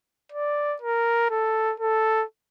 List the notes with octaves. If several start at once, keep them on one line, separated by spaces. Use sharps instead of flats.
D5
A#4
A4
A4